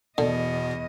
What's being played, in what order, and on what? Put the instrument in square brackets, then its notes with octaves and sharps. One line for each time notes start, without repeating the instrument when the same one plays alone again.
[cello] E2 D#5 [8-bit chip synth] B2 B3 [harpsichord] D3